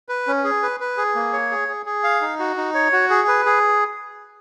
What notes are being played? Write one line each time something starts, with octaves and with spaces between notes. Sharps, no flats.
B4
C#4
G#4
B4
B4
G#4
A#3
C#5
G#4
G#4
G#4
F5
D#4
F#4
D#4
C#5
F#4
G#4
B4
G#4